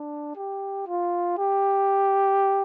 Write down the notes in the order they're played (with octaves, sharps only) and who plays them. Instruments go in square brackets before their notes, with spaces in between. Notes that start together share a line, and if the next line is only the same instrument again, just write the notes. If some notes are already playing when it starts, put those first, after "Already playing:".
Already playing: [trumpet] D4
G4
F4
G4